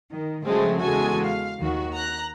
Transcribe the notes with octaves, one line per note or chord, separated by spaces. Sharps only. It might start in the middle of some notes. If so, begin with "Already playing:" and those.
D#3
C#3 F3 F#3 G#3 A3 C4
E2 C#3 G#3 F#4 A4 G#5
F5
D#2 D#3 F#4
A#5 F#6